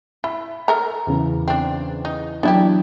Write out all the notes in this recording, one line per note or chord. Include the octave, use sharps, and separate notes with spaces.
E4 B5
A4 A#4 A#5
E2 C#3
C4 D4
D#4
E3 F#3 B3 D4 E4 G4